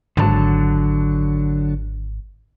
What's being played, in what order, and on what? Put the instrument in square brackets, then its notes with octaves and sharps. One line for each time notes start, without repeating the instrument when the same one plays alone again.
[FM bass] G#1 [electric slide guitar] D3 F#3 A5